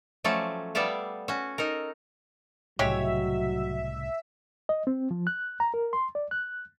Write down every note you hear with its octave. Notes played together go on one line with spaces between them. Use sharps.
F3 F#3 A3 C#4 A4 D5
G3 B3 A4 D5 E5 F5
C#4 F#4
D#4 A4 A#4
C2 A2 C#3 F#3 G#3 G4 C#5 E5
D#5
C4
F3
F#6
A#5
A#4
C6
D5
F#6